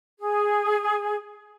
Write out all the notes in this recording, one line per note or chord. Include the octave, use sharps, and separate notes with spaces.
G#4